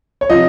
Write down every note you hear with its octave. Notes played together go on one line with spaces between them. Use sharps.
C#5
C3 F3 D#5